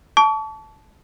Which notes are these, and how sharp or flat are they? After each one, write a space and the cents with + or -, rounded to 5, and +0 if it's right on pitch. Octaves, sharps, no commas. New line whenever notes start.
A5 -10 C#6 +45